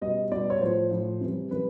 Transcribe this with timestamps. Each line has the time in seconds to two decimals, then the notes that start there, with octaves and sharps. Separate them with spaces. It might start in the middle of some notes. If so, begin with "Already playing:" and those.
0.01 B2 G3 D#5
0.32 B2 G3 D5
0.50 C#5
0.61 A2 F3 C5
0.91 A2 F3
1.21 C3 E3 G3
1.51 C3 E3 G3 B4